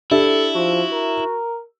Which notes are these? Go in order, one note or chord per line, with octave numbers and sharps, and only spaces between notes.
D4 E4 G4 A4 E5
F3 F#4
A#4